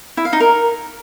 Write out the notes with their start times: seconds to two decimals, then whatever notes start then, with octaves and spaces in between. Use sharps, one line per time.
0.17 E4
0.25 F5
0.33 D#4
0.40 A#4